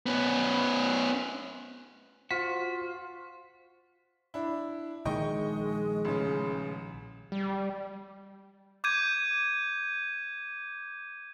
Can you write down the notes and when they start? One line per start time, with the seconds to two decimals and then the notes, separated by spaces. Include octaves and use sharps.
0.06 B3 C#4
2.31 F4 F#4 C5 B6
4.34 D4 E4
5.05 A#1 D#3 G#3 D#5 G5 C#6
6.05 A1 C#3
7.32 G3
8.84 D6 G6 G#6 D#7